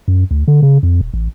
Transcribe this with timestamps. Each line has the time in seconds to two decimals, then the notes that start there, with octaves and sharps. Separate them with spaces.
0.08 F#2
0.31 D2
0.48 D3
0.62 C#3
0.83 F2
1.01 D#1
1.14 A1